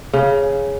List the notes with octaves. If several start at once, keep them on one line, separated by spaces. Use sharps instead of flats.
C#3